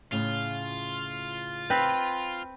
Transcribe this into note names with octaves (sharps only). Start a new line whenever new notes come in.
A2 C#3 F4
C4 B4 G5